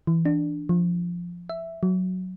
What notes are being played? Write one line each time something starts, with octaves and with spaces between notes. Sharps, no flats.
E3
D4
F3
E5
F#3